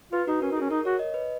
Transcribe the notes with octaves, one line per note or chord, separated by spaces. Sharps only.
F4 B4
D#4 F#4
C#4 A#4
D#4
G#4
C#4
D#4 A#4
F#4 C#5
D#5
B4